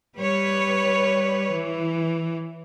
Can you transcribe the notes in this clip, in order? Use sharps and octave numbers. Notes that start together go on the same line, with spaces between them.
G3 B4 C#5
E3